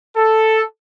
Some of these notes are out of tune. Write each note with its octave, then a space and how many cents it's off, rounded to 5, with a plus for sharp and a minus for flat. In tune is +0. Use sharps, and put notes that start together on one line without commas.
A4 +0